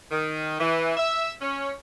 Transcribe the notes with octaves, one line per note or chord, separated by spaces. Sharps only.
D#3
E3
E5
C#4